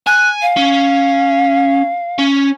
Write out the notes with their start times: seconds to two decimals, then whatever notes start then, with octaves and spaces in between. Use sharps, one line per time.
0.07 G#5 F#6
0.42 F5
0.57 C#4
2.19 C#4